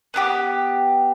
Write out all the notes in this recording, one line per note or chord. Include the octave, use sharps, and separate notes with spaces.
B3 D4 G4